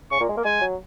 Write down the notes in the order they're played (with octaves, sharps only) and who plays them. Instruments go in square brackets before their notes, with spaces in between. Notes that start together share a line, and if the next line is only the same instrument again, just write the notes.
[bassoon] C#3 [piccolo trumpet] C#6
[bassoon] A#2
G#3
A#3
[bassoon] G#3 [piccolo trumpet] G#5
[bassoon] F#3